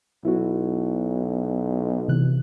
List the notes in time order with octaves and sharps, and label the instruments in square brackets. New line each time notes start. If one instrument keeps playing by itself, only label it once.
[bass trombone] B1 [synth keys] E4 F#4
[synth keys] C3 E3 F#6